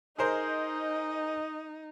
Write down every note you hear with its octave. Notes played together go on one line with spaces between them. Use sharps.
D#4 G#4 A#4 C5 D#5